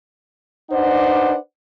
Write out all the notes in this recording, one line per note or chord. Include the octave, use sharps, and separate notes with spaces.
D4 D#4 B4 C5 D5 F#5